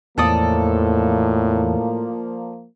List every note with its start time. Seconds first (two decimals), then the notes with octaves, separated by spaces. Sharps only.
0.18 E2 A2 F3 A#3 A4 D5 D#6